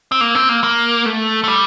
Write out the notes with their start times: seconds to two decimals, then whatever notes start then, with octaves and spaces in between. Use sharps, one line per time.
0.12 C4
0.21 A#3
0.35 C4
0.49 A#3
0.64 A#3
1.06 A3
1.44 A3
1.48 G3